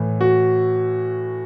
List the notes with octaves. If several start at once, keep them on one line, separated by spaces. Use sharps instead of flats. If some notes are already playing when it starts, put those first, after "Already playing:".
Already playing: A2 E3
F#4